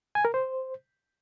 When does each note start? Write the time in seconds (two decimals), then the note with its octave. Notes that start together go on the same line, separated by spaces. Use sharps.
0.15 G#5
0.25 A#4
0.34 C5